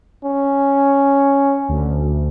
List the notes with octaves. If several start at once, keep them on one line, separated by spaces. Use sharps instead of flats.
C#4
D2